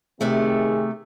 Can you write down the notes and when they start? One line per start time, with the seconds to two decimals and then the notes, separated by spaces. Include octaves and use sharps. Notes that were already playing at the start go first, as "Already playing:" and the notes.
0.21 C3 D#3 A3 C4 G#4